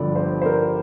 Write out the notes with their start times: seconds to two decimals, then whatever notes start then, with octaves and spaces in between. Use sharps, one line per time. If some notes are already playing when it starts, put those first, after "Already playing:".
Already playing: G1 G2 D3 F3 D5
0.16 C5
0.42 C5
0.46 A#4